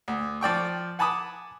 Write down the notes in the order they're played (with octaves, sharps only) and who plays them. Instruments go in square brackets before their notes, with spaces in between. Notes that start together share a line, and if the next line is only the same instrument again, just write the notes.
[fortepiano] D2
F3 D5 G5 C#6
F#5 G#5 A5 B5 D6 D#6